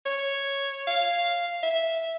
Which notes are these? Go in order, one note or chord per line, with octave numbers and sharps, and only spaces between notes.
C#5
F5
E5